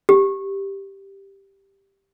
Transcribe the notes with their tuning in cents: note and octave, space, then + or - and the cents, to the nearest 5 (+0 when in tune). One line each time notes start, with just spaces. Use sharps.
G4 +0